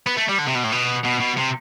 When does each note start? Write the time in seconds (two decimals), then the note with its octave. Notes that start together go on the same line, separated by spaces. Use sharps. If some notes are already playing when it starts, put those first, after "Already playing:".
0.07 B3
0.17 A3
0.28 G3
0.38 D3
0.47 C3
0.55 B2
0.64 A2
0.72 B2
1.05 B2
1.20 B2
1.37 C3